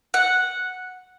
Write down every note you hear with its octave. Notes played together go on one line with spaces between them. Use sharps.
F#5